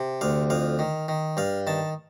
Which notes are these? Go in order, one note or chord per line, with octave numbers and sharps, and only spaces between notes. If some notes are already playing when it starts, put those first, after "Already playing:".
Already playing: C3
D2 F5
F2 F5
D#3
D#3
G2 F5
D#3 A5